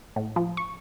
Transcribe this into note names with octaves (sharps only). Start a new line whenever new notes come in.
A2
F3
C#6